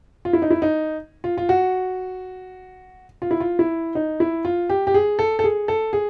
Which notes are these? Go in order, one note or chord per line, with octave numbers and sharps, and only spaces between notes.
F4
E4
D#4
E4
D#4
F4
F4
F#4
F4
E4
F4
E4
D#4
E4
F4
G4
G4
G#4
A4
A4
G#4
A4
G#4